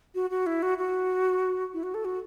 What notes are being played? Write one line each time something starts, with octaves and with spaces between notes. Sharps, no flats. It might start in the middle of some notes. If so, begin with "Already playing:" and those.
F#4
F#4
E4
F#4
F#4
E4
F#4
A4
F#4